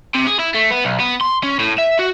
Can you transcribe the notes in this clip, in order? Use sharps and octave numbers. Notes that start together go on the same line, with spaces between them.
C3
G#4
E4
A3
B3
B1
B3
C6
C#4
A2
E5
F#4